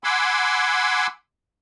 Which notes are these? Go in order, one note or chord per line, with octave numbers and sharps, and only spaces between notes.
F#5 G#5 B5 C6 D6 E6